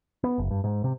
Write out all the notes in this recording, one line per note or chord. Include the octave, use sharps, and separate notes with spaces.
B3
F#1
G2
G#2
C3